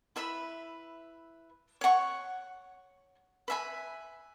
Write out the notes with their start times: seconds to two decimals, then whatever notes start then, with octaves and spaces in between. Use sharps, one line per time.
0.16 E4 B4 E5 B5
1.81 C#5 F#5 C#6
3.48 B4 E5 G#5 B5